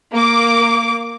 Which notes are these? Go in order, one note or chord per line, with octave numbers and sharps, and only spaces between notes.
A#3 D6